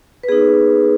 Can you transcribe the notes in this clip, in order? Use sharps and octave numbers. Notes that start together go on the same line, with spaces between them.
B4
B3 D#4 G#4